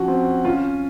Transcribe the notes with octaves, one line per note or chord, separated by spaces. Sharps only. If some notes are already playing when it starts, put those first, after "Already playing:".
Already playing: F3 C#4 F#4
C4
C#4 F4